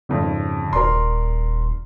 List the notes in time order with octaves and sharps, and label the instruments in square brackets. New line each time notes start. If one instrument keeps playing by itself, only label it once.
[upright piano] G#1 F2 [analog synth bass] C#3
[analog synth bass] D#1 [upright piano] A#4 D5 C6